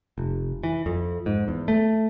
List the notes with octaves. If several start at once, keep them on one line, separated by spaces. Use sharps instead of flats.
F1
E3
F2
G#2
E2
A3